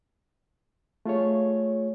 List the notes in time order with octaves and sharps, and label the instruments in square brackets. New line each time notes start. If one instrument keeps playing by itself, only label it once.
[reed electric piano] A3 F4 G#4 C#5